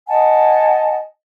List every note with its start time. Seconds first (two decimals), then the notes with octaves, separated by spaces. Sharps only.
0.08 D#5 F#5 G#5 A5